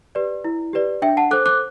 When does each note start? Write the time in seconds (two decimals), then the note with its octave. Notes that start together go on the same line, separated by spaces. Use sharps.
0.15 G4 B4 D5
0.44 E4
0.73 G4 B4 D5
1.02 D4 E5 G5
1.17 F#5 A5
1.31 A4 C5 D6 F#6
1.46 D6 F#6